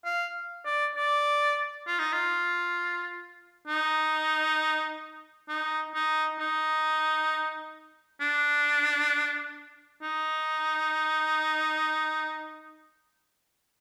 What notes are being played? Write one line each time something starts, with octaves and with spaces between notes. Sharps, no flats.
F5
D5
D5
F4
D#4
F4
D#4
D#4
D#4
D#4
D4
D#4